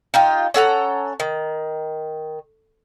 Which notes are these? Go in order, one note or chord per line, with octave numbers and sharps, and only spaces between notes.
D#4 F4 G4
C#4 A4 F#5 A#5
D#3